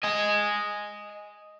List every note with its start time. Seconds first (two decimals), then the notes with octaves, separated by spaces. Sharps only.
0.04 D#5 G#5